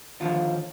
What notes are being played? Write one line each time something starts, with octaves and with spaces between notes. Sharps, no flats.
D#2 D3 F3 F4